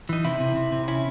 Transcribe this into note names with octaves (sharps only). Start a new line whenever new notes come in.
E3 D#4
C3 E4
C3
C3
C3
C#4 E4